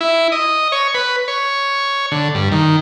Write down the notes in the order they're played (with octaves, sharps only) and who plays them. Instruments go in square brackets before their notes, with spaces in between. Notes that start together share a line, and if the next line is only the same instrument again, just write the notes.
[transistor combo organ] E4
D#5
C#5
B4
C#5
D3
G2
D#3